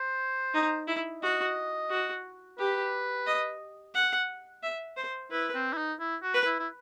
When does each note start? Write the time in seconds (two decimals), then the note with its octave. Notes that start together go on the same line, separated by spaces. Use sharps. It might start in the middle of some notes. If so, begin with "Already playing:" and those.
Already playing: C5
0.54 D#4
0.88 E4
1.23 F#4 D#5
1.90 F#4
2.59 G4 B4
3.27 D#5
3.95 F#5
4.63 E5
4.97 C5
5.31 E4 B4
5.55 C4
5.73 E4
5.77 D#4
6.00 E4
6.23 F#4
6.34 B4
6.46 E4
6.59 E4